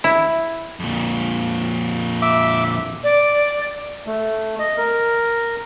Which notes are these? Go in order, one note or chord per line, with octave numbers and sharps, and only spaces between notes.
E4
F2 A#2
E5 D6
D5
A3
D#5
A#4